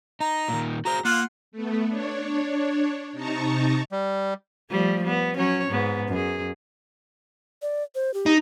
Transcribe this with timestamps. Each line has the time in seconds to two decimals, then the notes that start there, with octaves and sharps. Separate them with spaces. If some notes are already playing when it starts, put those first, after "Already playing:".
0.20 D#4 A#5
0.48 A#2 D#3
0.85 F#4 G#4 C5 A#5
1.05 A#3 F4 F#5
1.52 A3 B3
1.88 D4 C#5
3.13 C3 D#4 A5 A#5 C#6
3.92 G3
4.70 F3 G3 A3
5.04 G3 B3
5.37 F#3 C#4 C#5
5.70 G#2 B3
6.09 F#2 G#4
7.62 D5
7.95 C5
8.14 G4
8.26 D#4